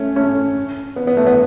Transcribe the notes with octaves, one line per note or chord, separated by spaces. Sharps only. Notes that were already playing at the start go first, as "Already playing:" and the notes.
Already playing: A3 C#4
A3 C#4
B3
B3
A3
B3